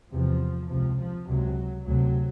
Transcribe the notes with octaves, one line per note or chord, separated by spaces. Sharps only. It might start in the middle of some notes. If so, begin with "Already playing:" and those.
E2 C3 F3
C#2 C3 F3
F3
C#2 C3 F#3
D2 C3 F#3